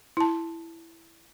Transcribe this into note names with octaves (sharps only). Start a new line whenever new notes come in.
E4 A5